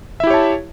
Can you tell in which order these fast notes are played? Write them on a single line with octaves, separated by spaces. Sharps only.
E5 E4 G4 C#5 A5